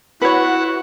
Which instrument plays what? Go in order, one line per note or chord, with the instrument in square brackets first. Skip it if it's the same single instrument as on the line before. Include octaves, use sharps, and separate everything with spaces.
[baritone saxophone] E4 [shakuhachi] F#4 [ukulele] B4 C#5 [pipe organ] F#5